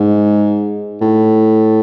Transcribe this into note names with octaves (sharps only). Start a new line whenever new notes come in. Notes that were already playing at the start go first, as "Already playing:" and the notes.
Already playing: G#2
A2